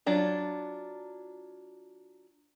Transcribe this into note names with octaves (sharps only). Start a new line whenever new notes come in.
F#3 D4 F4